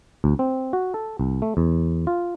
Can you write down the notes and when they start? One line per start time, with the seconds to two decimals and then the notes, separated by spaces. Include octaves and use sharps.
0.24 D2
0.39 C4
0.73 F#4
0.94 A4
1.19 C2
1.42 A3
1.57 E2
2.07 F4